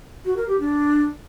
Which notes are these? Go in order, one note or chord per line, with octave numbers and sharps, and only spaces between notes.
F#4
A#4
G4
D4